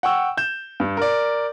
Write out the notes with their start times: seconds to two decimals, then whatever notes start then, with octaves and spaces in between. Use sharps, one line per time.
0.03 F#5 G5 C#6 E6
0.38 G6 E7
0.80 G2
0.97 A#4 D5